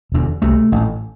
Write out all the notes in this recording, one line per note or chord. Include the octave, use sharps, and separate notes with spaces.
E1 E2 D3
C2 C3 A3
A1 A2